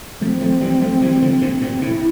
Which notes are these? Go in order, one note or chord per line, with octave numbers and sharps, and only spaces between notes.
F3 A3 C4
F3 A3
E3 G3
G3
F3 A3
E3 G3
G3
D3 F3
A#2 D3
G2 A#2
A2 C3 E4